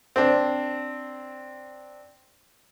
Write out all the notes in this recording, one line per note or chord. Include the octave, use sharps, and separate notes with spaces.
C4 D4